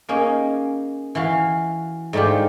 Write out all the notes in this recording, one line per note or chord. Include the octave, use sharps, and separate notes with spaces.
A#3 C#4 D#4 G#4
E3 F#4 F5
G#2 A3 D4 F4 G4